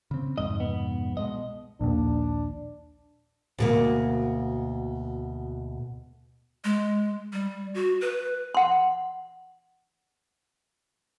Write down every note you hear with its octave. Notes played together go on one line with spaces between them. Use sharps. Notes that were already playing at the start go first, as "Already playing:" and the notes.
C#3 C4
C2 F2 G#2 D#5
B3
B2 G#3 D#5
A#1 D#2 D4
D2 B2 A#3
G#3
G3
F#4
B4
F#5 C6